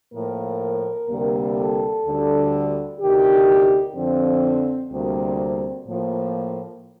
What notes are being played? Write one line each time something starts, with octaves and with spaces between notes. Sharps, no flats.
A2 F3 A#3 A#4
D2 C3 G3 A#3
A4
D2 D3 G3
D2 C3 D#3 G4
F2 D3 F3 C4
D2 C3 G3 A#3 C4
A2 F3 A#3